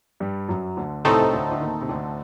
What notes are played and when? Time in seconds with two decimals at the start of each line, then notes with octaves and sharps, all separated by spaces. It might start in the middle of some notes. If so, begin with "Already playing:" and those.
0.20 G2 G3
0.48 F#2 F#3
0.77 D2 D3
1.05 C2 A2 C3 A3 C4 D#4 A4
1.21 C3
1.33 D2 D3
1.52 D3
1.61 D#2 D#3
1.81 C3
1.89 D2 D3